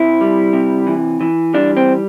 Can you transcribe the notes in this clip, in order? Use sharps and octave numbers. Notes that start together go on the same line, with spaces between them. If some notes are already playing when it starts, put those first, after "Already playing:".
Already playing: C3 E4
G3
C3
E3
E3
G3 D4
C4